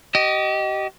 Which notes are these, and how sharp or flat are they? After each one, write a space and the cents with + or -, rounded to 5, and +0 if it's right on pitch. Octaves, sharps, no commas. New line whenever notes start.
G4 -35 D#5 +0